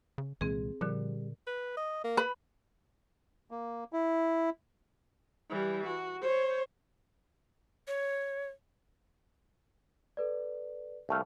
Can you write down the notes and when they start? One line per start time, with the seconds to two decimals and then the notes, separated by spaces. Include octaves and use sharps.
0.18 C#3
0.41 C2 A#2 E3 G#3 C4 G#4
0.81 A#2 D3 F3 G3
1.47 B4
1.77 D#5
2.04 A#3
2.17 B4 B5
3.51 A#3
3.93 E4
5.50 E3 G3
5.86 F#4
6.22 C5 C#5
7.88 C#5
10.17 A4 B4 D5
11.09 C2 A3 F5